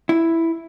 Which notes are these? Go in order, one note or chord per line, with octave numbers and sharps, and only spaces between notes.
E4